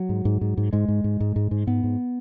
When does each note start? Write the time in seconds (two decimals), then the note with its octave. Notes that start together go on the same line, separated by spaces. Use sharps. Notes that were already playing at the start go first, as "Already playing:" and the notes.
Already playing: F#3
0.09 G#2
0.25 G#2
0.41 G#2
0.57 G#2
0.73 G#2 G#3
0.88 G#2
1.04 G#2
1.20 G#2
1.36 G#2
1.51 G#2
1.67 G#2 B3
1.83 G#2